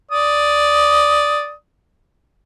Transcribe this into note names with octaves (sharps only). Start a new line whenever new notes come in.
D5 D#6